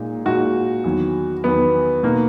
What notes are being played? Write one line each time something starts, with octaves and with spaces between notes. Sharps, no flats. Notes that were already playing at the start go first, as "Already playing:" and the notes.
Already playing: A#2 G#3 D#4
A#2 G#3 D#4 F#4
E2 D#3 F#3
E2 D#3 F#3 B3
B2 A#3 D#4